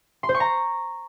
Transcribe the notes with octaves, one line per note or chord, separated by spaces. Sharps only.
C6
C5
C#6
A#5